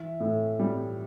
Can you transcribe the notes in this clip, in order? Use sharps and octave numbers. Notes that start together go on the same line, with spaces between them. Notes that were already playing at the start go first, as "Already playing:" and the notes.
Already playing: E3 E5
A2
G3